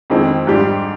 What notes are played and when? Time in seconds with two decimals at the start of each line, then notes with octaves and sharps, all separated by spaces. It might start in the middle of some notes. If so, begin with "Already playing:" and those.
0.10 F2 D#3 G#3 C4
0.47 G#2 G3 D4 G4